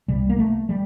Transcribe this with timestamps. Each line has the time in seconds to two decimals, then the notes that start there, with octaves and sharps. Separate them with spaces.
0.08 C2 C3 G3
0.29 A#3
0.39 A3
0.69 G3